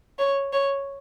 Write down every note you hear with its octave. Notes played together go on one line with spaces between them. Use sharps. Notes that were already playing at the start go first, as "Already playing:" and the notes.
C#5
C#5